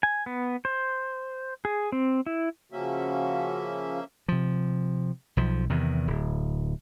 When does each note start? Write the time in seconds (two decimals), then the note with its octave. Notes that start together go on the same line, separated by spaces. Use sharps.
0.03 G#5
0.26 B3
0.65 C5
1.65 G#4
1.92 C4
2.26 E4
2.72 C#3 F3 A#3 C#4 F#4 E5
4.28 C3 F3
5.37 B1 F3
5.70 E2 C3 D#3
6.07 D1